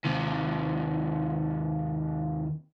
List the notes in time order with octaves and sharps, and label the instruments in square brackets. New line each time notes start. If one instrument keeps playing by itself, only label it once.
[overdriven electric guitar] D#2 C3